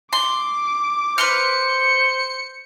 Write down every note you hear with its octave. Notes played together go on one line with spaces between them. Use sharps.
C6 D6
B4 C5 C6 F6 C#7